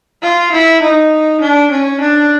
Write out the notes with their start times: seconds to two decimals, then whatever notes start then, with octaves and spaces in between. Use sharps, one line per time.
0.22 F4
0.52 E4
0.82 D#4
1.41 D4
1.71 C#4
2.01 D4